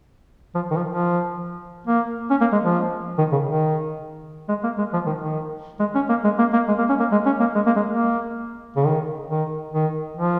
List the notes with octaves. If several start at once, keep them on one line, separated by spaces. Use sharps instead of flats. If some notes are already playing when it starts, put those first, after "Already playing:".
F3
D#3
F3
F3
A#3
C#4
A#3
G#3
F3
D#3
C#3
D#3
G#3
A#3
G#3
F3
D#3
D#3
G#3
C#4
A#3
G#3
A#3
A#3
G#3
A#3
C#4
A#3
G#3
C#4
A#3
G#3
A#3
G#3
A#3
C#3
D#3
D#3
D#3
F3